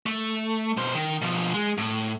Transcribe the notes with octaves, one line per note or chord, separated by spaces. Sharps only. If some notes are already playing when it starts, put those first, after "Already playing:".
A3
B2 C5
D#3
B2 F3
G#3
A2